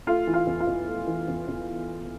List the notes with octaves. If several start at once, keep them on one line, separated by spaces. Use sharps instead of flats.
A3 F4
E3
F4
E2
F4
E2
A3
E3
E2
E2